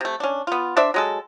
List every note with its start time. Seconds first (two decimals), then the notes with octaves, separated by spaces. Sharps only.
0.01 C3 A3
0.20 C#4 D4
0.47 B3 F4
0.77 D4 C5 D5 E5
0.94 F#3 G#3 A4